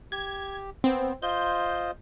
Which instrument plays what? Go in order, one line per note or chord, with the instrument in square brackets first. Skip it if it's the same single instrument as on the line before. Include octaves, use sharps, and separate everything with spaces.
[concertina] G4 [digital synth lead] G#6
[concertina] B3 [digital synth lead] C4
[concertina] F4 C5 D#5 [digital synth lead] G6